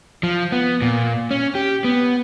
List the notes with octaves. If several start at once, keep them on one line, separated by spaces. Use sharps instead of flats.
F3
B3
A#2
C#4
G4
B3